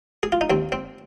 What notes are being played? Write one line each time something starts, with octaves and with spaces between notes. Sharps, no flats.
G#4
F4
D#4
D#2 C4
C4